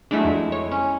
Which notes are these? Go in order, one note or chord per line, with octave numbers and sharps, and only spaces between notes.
F#3 G#3 A3 D4 E4 E5
F2
C#5
C#4